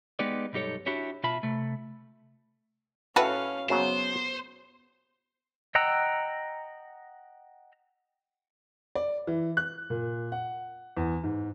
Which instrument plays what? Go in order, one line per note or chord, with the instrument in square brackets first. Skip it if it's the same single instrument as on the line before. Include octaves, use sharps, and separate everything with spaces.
[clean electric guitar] G#3 B3 D#4 G4 B4 D5
B1 G2 D#4 G4 A4 C#5
D4 E4 F#4 G4 C#5
B2 F4 E5 A5 B5
C3 A3
[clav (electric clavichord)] A2 [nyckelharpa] C#4 F5 [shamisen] F#4 A4 B4
[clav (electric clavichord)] F#2 C#3 F#3 [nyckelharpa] B3 [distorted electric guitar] C5
[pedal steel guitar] D#5 F#5 G5 A#5 E6
[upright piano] D5
E3
F#6
A#2
F#5
E2
G#2